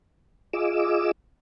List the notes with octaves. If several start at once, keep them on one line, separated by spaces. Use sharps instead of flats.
F4 G#4 D#5 D6 E6